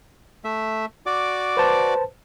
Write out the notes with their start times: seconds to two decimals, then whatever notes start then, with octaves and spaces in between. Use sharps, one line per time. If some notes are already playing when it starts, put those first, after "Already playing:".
0.44 A3 E5
1.06 F#4 D5 D6
1.57 B4 C5 A5